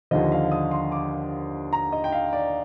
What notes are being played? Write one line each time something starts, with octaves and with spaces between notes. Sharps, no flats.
D#2 D3 F3 D#5
F5
D#6
C6
D6
A#5
D#5
G5
F5
D5